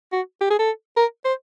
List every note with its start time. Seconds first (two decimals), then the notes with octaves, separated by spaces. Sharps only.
0.12 F#4
0.41 G4
0.50 G#4
0.59 A4
0.97 A#4
1.25 C5